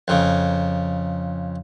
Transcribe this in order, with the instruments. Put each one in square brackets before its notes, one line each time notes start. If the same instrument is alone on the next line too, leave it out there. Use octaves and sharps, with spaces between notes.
[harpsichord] F2 C#3